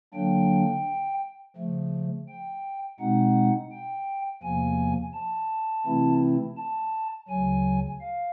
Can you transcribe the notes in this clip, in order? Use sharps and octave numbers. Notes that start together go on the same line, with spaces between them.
D3 F#3 A#3 D4 G5
C#3 F3 A3
G5
B2 G#3 C4 D#4 F#5
G5
E2 C3 F3 A#3 G#5
A5
C3 E3 A3 C4 E4
A5
D2 C#3 F#3 G#5
F5